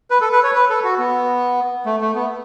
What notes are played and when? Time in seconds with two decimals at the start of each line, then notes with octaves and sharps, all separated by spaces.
0.11 B4
0.21 A4
0.32 B4
0.43 C#5
0.55 B4
0.69 A4
0.84 F#4
0.99 B3
1.86 A3
2.01 A3
2.15 B3